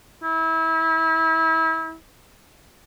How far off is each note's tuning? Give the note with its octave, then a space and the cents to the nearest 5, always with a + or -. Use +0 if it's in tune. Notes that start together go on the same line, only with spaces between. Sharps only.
E4 -30